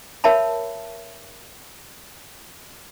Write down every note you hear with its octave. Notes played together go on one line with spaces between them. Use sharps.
A#4 C#5 E5 A5 B5